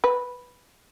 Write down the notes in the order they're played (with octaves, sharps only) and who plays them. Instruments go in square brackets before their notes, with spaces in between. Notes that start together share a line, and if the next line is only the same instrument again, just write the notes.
[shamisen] B4